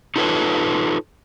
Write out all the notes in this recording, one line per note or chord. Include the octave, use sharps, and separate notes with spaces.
D#4 F4 A4 B4 C#5